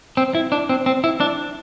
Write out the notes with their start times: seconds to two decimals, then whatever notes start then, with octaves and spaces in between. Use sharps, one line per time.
0.17 C4
0.35 E4
0.52 D4
0.69 C4
0.86 C4
1.04 E4
1.20 D4